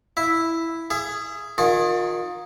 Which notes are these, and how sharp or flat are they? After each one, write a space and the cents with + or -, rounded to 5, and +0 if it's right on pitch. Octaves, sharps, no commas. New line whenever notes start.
E4 +0 E5 +0
G#4 +0 E5 +35
D#3 +0 F4 +40 G#4 +0